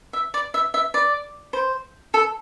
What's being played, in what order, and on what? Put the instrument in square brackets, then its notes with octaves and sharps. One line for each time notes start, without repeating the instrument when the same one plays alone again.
[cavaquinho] E5
D5
E5
E5
D5
C5
A4